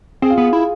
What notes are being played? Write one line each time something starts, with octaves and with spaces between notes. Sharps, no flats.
C4 G#4
F4
B3 G#4
E4